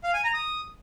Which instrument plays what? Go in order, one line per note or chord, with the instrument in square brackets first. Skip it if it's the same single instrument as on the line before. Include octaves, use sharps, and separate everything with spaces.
[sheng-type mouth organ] F5
G#5
A#5
D#6